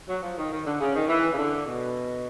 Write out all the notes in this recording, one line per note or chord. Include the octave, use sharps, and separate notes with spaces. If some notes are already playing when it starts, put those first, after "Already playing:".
F#3
F3
D#3
D#3
D3
C#3
D#3
E3
C#3
D3
B2